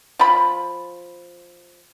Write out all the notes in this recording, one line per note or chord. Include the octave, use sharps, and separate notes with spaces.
F3 B5